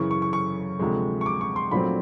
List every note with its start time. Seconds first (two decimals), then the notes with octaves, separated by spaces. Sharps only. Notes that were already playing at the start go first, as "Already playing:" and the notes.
Already playing: F#2 C#3 E3 C#6
0.11 C#6
0.22 C#6
0.33 C#6
0.79 D2 C3 F3 G#3
1.21 C#6
1.26 D6
1.41 C#6
1.56 C6
1.71 A#1 A#2 F#3 A3 C4 B5